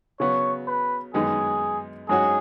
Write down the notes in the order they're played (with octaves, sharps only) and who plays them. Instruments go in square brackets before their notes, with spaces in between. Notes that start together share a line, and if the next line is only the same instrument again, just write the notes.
[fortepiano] C#3 F#3 B3 [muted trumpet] C#5
[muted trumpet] B4
[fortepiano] F#2 D#3 G#3 B3 D#4 [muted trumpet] G#4
[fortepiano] G#2 F#3 C#4 F#4 [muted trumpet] G#4